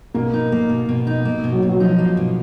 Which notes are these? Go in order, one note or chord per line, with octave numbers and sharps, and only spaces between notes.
B2 A#3
D#4
A#3
B2
B2
D#4
A#3
B2
F#3
B2
F#3
F3 D#4
A#3
B2